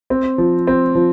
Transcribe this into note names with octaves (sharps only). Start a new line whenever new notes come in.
C4
F3
C4
F3